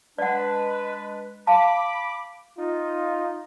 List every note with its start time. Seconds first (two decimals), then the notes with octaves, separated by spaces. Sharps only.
0.18 G#3 D4 B4 D5 F#5
1.47 F5 A5 B5 D6
2.58 D#4 F4